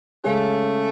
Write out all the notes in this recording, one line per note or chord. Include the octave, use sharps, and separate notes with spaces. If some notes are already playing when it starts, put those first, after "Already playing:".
C#3 G#3 A3 C#4 G#4